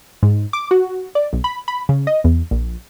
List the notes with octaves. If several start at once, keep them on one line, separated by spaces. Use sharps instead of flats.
G#2
D6
F#4
D5
B1
B5
B5
C#3
D#5
E2
A#1